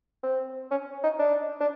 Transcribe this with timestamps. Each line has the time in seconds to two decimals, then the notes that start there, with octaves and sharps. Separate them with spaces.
0.23 C4
0.71 C#4
1.03 D#4
1.19 D4
1.61 D4